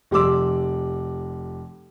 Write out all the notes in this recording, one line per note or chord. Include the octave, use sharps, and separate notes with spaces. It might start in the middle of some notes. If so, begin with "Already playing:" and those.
F1 G3 C6 D6 E6